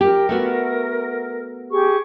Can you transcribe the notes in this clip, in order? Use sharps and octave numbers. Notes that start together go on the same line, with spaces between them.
G4 A#4
A3 B3 F#4
G4 G#4 C#6